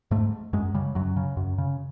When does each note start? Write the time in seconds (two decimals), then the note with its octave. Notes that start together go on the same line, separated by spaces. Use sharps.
0.11 G#2 A3
0.53 F#2 G#3
0.74 C#3 G3
0.95 F#2 F#3
1.16 C#3
1.37 F#2
1.58 C#3